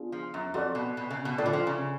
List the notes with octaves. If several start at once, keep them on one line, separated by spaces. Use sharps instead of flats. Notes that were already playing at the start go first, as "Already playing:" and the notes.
Already playing: B3 D4 F4 G#4
F3
F#2
F2 F#4 A4 D5
B2
B2
C#3
B2
A2 F4 A4 D5
D3
F3
C#3